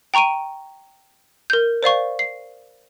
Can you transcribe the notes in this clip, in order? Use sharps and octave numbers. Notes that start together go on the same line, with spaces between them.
G5 A#5 C#6 D7 D#7
A#4 G6
C5 D5 F5 C#6
C7